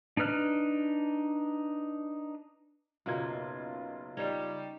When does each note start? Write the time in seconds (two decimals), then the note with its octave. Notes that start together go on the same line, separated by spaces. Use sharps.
0.17 D4 D#4 B4 F6 F#6
3.06 F#1 B2 A#3 D#4 F4 G#6
4.17 G3 C#4 D#4 C#5